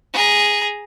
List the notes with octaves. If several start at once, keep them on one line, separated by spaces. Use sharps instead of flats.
G#4 A#5